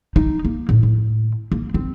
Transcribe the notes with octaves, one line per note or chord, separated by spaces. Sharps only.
D#4
A#3
A2
A2
A#3
C4